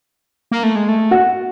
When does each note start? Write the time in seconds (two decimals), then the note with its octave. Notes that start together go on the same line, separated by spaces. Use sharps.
0.51 A#3
0.63 A3
0.76 G#3
0.89 A3
1.11 F#4